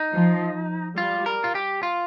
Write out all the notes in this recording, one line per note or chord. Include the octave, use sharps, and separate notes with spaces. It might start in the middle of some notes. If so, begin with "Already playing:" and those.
Already playing: D#4
F3
G3 F4
A#4
F4
G4
F4